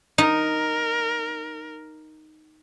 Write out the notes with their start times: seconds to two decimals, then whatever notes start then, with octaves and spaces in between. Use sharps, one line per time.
0.18 D#4 A#4